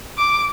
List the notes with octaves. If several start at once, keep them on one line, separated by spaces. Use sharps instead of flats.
D6